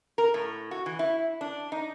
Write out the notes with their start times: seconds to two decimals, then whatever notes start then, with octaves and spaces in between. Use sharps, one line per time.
0.18 A#4
0.34 A2
0.71 F#4
0.86 E3
0.99 E4
1.41 D4
1.72 D#4